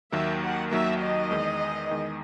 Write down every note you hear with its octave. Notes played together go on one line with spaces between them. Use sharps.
D#2 D#3 F#3 A#3 E5
F#5
D#2 D#3 F#3 A#3 E5
D#5
E2 D#3 G#3
E2 D#3 G#3